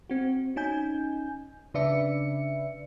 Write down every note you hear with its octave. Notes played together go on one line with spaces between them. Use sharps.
C4 F#4
C#4 D#4 G#5 G6
C#3 D4 B4 D5 E5 C#7